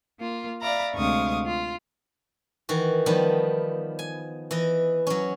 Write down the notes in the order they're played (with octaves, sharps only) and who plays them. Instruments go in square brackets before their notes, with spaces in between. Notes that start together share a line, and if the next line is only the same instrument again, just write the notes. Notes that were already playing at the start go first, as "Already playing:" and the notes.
[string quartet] A#3 F4
D5 E5 F5 A#5 B5
D2 C3 G#3 F5 C#6 D#6
F4
[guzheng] D#3 E3 F#4
D#3 F3 G3 B3
G#5
E3 E4 D#5
F#3 C#4